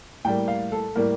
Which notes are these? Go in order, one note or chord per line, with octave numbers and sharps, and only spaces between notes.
A2 G3 A#3 G5
F5
A4
A2 G3 A#3 A#4